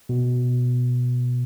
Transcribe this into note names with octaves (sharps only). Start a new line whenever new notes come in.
B2